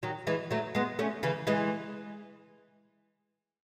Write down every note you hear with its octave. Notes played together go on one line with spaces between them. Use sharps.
D#3 F#3
E3 G#3
F#3 A3
G#3 B3
A3 C#4
C#3 E3
E3 G#3